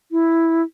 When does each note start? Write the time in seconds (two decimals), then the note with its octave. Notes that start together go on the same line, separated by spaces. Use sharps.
0.12 E4